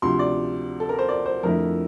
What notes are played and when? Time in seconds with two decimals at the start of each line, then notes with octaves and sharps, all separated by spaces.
0.02 D2 C3 F3 C6
0.19 D5
0.80 A4
0.89 A#4
0.99 C5
1.08 D5
1.26 C5
1.43 F2 D3 A3 E4 A#4